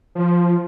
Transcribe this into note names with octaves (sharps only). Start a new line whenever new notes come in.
F3